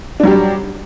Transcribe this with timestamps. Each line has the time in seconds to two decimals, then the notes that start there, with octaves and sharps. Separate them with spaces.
0.20 D4
0.23 F#3
0.27 G4
0.31 G3